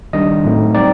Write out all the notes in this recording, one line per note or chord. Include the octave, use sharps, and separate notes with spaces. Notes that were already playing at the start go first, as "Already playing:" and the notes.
D#3 G3 D4 D#5
A2 F#3 A3 C4 D#4
G3 C4 D#4 D5